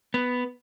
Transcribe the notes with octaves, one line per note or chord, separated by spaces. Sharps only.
B3